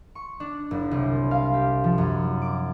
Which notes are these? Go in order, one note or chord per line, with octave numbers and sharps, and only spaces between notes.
C#6
D4
F#1
C2
F5
G4
F3
F#2
D6